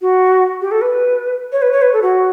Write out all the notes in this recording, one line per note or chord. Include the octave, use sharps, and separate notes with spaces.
F#4
G4
A4
B4
C#5
B4
C#5
B4
A4
F#4